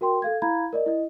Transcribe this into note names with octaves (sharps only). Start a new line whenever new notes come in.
F#4 A#4 G5 C6
A4 F5 G#6
E4 F5 A#5 B5 G#6
A#4 D5 D#5
E4 D#5